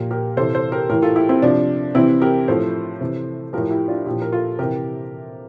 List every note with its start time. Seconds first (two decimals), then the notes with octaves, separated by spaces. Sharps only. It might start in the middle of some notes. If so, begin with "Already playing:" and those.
Already playing: A#2 F3 G4 A#4
0.11 G4 A#4
0.37 C3 E3 A4 C5
0.54 A4 C5
0.72 G4 A#4
0.89 A2 E3 G4 A#4
1.02 F4 A4
1.16 E4 G4
1.29 C4 E4
1.42 C3 F3 D4
1.95 C3 E3 C4 E4
2.21 G4 A#4
2.48 A2 F3 A4 C5
3.01 C3 E3
3.53 A2 F3 G4 A#4
3.71 E4 G4
3.88 D4 F4
4.06 A#2 F3 E4 G4
4.22 A#4
4.32 F4 A4
4.59 C3 G4 A#4
4.63 E3